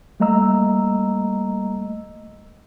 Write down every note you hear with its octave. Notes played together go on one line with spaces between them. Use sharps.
G3 A3 A#3 D#5 A#5 E6